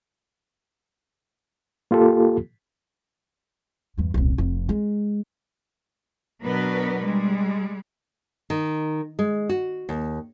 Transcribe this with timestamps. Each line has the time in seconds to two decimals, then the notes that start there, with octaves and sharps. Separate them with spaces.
1.91 A#3 F4 G4 A4
3.98 E2 G2
4.14 D#1 C2
4.38 F1 F2
4.69 G#3
6.43 B2 F#3 B3 D4 A#4 B4
7.06 G3 G#3
8.50 D#3
9.19 G#3
9.49 F#4
9.89 D#2